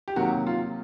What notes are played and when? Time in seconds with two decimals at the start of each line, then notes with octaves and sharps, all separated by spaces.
0.08 G4
0.16 C3 D#3 F#3 A#3 F#4
0.47 F4